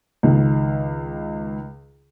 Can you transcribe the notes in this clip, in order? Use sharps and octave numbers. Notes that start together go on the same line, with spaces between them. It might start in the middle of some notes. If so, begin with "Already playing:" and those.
C#2 D#3